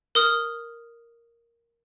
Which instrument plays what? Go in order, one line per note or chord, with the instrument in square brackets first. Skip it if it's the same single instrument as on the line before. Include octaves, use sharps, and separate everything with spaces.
[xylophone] A#4 D#6 F6